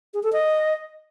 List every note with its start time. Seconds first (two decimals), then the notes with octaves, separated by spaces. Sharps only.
0.14 G#4
0.23 A4
0.33 D#5